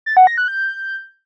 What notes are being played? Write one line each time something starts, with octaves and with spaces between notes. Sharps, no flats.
A6
F#5
A#6
F#6
G6